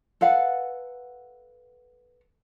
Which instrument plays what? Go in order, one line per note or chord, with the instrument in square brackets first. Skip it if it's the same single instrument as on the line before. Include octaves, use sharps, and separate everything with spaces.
[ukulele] A4 B4 F5 F#5